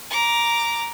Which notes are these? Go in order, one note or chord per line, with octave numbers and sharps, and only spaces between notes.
A#5 D6